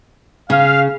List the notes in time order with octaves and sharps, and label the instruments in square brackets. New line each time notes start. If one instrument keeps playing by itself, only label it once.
[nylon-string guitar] C#3 [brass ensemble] F5